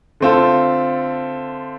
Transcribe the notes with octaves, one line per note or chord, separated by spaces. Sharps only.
D3 A3 C4 F4 A4